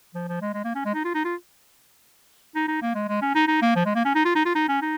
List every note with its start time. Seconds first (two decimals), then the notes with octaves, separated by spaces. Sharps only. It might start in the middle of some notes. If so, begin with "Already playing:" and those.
0.15 F3
0.28 F3
0.41 G#3
0.54 G#3
0.64 A#3
0.75 C#4
0.85 G#3
0.94 D#4
1.05 F4
1.15 D#4
1.25 F4
2.55 D#4
2.68 D#4
2.82 A#3
2.95 G#3
3.08 G#3
3.22 C#4
3.35 D#4
3.48 D#4
3.62 A#3
3.76 F3
3.86 G#3
3.95 A#3
4.05 C#4
4.15 D#4
4.25 F4
4.35 D#4
4.45 F4
4.55 D#4
4.68 C#4
4.82 D#4